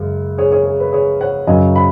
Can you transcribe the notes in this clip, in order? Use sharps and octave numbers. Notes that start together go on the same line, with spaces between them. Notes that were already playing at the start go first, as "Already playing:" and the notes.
Already playing: F#2 C#3 G#3
G#4 C#5
G#4 C#5
G#4
B4
G#4 C#5
C#5 F#5
F#2 C#3 F#3 D#5 G#5
F#5 B5